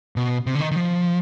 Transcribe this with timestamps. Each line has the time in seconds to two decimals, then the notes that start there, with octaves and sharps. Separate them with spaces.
0.16 B2
0.47 C3
0.55 D3
0.60 D#3
0.71 D#3
0.76 F3